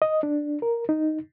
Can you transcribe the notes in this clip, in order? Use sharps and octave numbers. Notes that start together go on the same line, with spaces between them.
D#5
D4
A#4
D#4